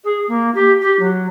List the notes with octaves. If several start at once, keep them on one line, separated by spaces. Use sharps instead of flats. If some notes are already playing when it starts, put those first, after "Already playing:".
G#4
A#3
G4
G4
F#3